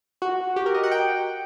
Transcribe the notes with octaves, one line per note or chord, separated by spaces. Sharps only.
F#4
G4
A#4
D#5
F#5
G5